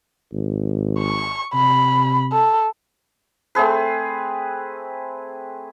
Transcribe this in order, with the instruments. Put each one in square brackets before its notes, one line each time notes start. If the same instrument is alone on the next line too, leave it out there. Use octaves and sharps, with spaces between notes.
[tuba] G#1
[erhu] C#6
[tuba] C3 [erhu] B5
[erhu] A4
[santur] A3 C4 G#4 B4